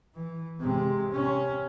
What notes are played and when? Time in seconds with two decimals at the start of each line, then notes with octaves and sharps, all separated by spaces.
0.14 E3
0.60 C3 G#3
1.11 C3 C#4